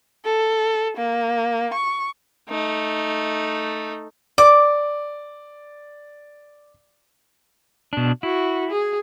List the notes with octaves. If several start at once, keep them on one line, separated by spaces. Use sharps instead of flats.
A4
A#3
C#6
A3 D#4
D5 D6
B2 D4
E4 F#4
G#4